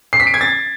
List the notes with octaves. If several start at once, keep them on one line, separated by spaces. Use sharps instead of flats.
C7
B6
D7
G#6
A6